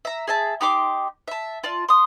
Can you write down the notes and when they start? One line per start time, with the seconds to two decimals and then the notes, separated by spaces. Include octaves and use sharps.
0.05 E5 A#5
0.27 G#4 E5 A5
0.61 D#4 G4 C6 D6
1.28 E5 A5
1.64 F4 D5 A5
1.89 C6 D#6